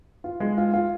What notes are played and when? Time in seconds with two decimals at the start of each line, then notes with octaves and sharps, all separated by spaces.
0.24 F4
0.40 G#3
0.58 F4
0.73 F4